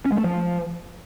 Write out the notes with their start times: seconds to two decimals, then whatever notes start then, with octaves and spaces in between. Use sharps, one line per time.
0.06 C#4
0.12 G#3
0.18 A3
0.24 F3